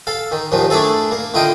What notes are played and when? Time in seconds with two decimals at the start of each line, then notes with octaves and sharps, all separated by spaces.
0.07 A4 F5
0.32 D#3
0.52 D#2 A#2 D#3 F3
0.70 A3 D4 E4 G#4 A4
1.11 A#3
1.34 D3 E4 F4 D#5 G5